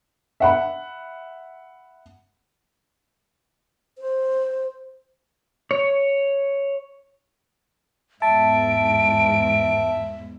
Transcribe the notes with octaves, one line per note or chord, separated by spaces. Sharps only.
E5 F#5 B5
C5
C#5
E2 G#2 E5 A5 D7